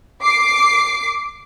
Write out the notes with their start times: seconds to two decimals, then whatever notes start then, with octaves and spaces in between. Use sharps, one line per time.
0.22 D6 C7